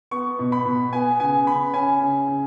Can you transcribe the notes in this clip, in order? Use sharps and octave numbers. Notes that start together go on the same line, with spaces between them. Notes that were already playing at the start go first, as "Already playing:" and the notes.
B3 C#6
B2
B5
B2
B3 G#5
C#3 G#5
C#3 B5
C#4 G#5
C#3
C#3